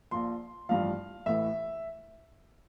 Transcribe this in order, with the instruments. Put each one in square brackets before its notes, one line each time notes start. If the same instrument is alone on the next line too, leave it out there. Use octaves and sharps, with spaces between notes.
[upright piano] A#1 A#2 F3 C6
A1 G2 F3 F5
A1 A2 E3 E5